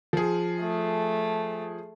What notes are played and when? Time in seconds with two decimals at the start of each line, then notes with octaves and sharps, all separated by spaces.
0.13 F3 G#4
0.61 A3